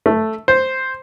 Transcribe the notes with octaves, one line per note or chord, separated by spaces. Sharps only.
A3
C5